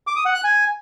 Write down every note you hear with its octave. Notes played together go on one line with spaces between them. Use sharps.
D6
D#6
F#5
F#6
G#5